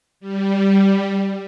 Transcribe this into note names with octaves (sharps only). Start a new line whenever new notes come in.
G3